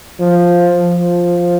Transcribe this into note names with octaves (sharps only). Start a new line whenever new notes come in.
F3
F3